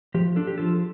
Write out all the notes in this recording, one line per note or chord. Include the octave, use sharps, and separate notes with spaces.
F3 G4
D4 A4
G4
F3 F4 A4